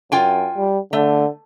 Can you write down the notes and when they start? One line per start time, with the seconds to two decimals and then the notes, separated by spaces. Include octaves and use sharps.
0.12 F#2 F4 G5 G#5
0.57 G3
0.93 D3 A3